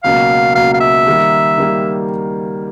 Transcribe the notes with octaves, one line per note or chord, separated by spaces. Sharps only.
C#2 B2 F#3 A#3 F5
C#2 B2 F#3 A#3 F5
F5
E5
D#3 G3 A#3
D#3 G3 A#3